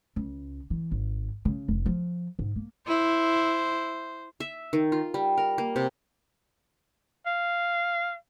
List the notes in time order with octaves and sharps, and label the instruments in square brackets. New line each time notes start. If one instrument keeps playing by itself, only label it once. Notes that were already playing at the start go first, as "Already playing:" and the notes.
[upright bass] C#2
E3
G#1
C#3
F1
F3
G#2
A#3
[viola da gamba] E4 [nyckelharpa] C5
[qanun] E5
D#3
F4
G3
A#4
A#3
C3
[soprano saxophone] F5